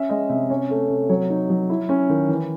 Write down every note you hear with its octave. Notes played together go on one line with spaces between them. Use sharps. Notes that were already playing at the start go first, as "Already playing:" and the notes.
Already playing: C#4 E5
G#3 D#5
C3 E5
C#4 C#5
A3
C3
F#3 C#5
D#4
F#3
E4
C#4
D#3
E3